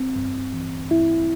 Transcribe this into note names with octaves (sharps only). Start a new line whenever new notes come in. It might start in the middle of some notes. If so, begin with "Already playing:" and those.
Already playing: C4
G2
E3
G2 E4